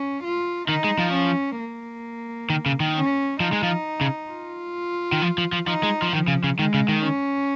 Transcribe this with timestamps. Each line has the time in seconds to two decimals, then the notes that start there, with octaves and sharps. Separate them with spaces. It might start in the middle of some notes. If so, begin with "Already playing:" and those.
Already playing: C#4
0.24 F4
0.68 D#3 D#4
0.84 G#3
0.99 F3
1.14 C#4
1.59 A#3
2.50 D#3
2.66 C#3
2.80 D#3
2.95 C#4
3.40 F3 D#4
3.53 G#3
3.63 F3
4.01 C#3
4.31 F4
5.12 D#3
5.22 F3
5.38 F3
5.53 F3
5.68 F3 D#4
5.83 G#3
6.02 F3
6.13 D#3 F3
6.28 C#3
6.44 C#3
6.59 D#3 G#3
6.74 C#3
6.88 D#3
7.04 C#4